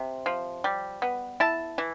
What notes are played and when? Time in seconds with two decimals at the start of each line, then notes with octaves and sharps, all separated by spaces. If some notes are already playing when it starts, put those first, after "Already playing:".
Already playing: C3
0.26 F3
0.64 G3
1.02 B3
1.40 E4 A5
1.78 E3